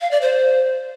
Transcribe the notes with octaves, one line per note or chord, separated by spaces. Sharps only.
F5
D5
C5